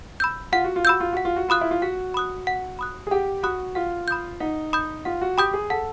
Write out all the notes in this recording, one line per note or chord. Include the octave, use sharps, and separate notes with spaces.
B5 E6 G6
F4 F#5
F#4
F4
F#4 B5 E6 G6
F4
F#4 F#5
F4
F#4
F4 B5 D#6 F#6
E4
F4
F#4 F#5
B5 D#6 F#6
F#5
B5 D#6 F#6
G#4
G4 F#5
F#4 B5 D#6 F#6
F4 F#5
B5 D#6 G6
D#4 F#5
B5 D#6 G6
F4 F#5
F#4
G4 B5 D#6 G6
G#4
A4 F#5